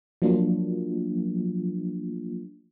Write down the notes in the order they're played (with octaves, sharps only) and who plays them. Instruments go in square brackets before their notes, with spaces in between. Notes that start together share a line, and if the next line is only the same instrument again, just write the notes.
[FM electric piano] F3 F#3 A3 A#3 D4 F4